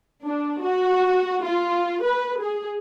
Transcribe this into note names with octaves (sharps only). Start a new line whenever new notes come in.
D4
F#4
F4
B4
G#4